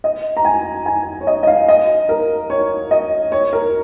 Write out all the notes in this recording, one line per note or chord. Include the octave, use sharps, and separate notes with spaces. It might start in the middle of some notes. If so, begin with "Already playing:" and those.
D#5
A#5
G#5
G#5
C#5
D#5
D#5
F5
D#5
A#4
C#5
D#5
C#5
A#4